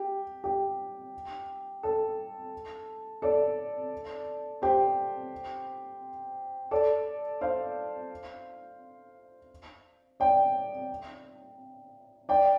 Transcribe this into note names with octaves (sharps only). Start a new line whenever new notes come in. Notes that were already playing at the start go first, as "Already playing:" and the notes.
Already playing: G4
G4
A4
A4 D5
G4 C5
A4 D5
C5 F5
D5 G5
D5 G5